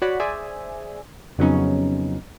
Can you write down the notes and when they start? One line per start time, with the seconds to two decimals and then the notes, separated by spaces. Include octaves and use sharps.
0.02 F#4 C#5 D5 F#5 B5
0.20 G#4 C5 D5 E5 G#5
1.38 F2 C#3 F#3 B3 C#4 D#4